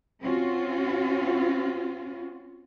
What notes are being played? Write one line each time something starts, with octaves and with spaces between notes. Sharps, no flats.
C4 C#4 F4 F#4